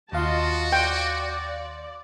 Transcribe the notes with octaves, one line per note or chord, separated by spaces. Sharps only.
D#2 F4 F#4 D#5 F5 A5 C6
D5 G5